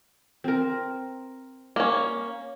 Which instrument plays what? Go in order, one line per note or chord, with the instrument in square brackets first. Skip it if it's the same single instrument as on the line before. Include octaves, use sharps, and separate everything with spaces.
[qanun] C4 A#4
[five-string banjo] A#3 C#4